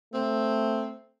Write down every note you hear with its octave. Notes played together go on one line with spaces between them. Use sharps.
A3 C4